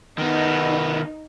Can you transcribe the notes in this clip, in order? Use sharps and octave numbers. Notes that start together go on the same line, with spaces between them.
D#3 B3 D#4